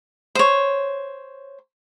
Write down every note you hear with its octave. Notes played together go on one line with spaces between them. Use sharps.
C5 C#5